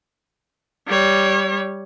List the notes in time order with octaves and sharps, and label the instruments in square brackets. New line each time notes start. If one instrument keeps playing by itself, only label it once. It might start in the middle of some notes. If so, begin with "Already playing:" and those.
[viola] G3 C#5